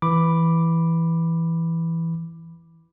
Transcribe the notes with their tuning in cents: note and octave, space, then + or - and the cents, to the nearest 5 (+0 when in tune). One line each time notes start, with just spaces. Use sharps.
E3 +0 B5 +0 D6 +0